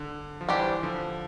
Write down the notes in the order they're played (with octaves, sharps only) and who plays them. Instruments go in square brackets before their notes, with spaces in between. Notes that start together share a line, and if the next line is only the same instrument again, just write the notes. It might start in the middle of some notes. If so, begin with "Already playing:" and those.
Already playing: [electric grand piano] D3
F3
[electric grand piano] E3 [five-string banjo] G3 D4 G4 C5
[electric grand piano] D3 F3